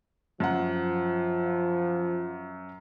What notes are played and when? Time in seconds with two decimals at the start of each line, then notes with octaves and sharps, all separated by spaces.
0.40 F#2 F3 F#5